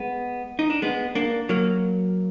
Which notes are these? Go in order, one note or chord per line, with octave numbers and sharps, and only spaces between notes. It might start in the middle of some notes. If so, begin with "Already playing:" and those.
Already playing: G#3 B3
D#4
D4
G#3 B3
A#3 D4
F#3 A#3